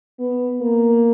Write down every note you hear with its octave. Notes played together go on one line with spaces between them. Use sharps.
B3
A#3